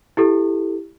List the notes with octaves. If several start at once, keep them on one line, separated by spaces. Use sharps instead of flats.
E4 G4 A4